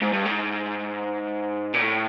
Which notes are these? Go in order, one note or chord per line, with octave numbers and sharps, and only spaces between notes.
G#2
G2
G#2
A#2
A2